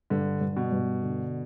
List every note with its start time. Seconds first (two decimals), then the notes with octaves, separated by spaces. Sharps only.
0.10 G2 D3
0.41 G2
0.56 B2
0.72 G2
1.02 D3